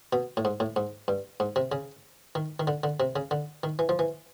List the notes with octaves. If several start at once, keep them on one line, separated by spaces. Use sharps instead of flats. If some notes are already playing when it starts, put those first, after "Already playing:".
B2
A2
G#2
A2
G#2
G2
G#2
C3
C#3
D#3
D#3
D3
D3
C3
C#3
D3
D#3
E3
F3
E3